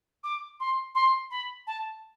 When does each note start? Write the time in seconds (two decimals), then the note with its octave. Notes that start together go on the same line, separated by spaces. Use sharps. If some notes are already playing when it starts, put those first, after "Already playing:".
0.23 D6
0.60 C6
0.94 C6
1.30 B5
1.67 A5